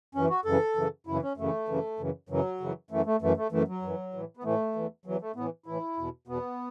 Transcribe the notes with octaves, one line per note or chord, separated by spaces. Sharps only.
F#2 E3 C#4
F#4
F#2 C#3 E3 A4
F#2 C#3 E3
F#2 C#3 E3 E4
C#4
F#2 C#3 E3 A3
F#2 C#3 E3
F#2 C#3 E3
F#2 C#3 E3 F#3
F#2 C#3 E3
F#2 E3 A3
A3
F#2 E3 A3
A3
F#2 E3 A3
F#3
F#2 E3
A2 E3
B3
A2 E3 A3
E2 E3
E2 E3 F#3
A3
A2 E3 B3
A2 E3 E4
E2 B2
E2 B2 B3